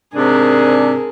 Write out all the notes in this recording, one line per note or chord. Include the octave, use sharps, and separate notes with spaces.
G#2 C3 D4 G#4 A#4